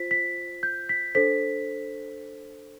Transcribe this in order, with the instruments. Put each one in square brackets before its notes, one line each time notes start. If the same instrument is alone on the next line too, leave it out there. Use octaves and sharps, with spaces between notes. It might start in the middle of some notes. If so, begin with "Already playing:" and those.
Already playing: [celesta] F4 C5 B6
B6
G6
B6
D4 A4 C5 B6